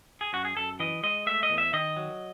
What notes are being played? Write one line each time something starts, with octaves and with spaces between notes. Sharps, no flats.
G#4
F#2 F#4
G#4
F#2 A4
E3 D#5
G#3 D#5
A3 E5
D#5
E2
E5
D#3 D#5
F#3